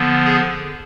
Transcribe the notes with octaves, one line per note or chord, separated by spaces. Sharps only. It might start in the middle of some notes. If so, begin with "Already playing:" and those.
Already playing: D3 F3 B3
G#4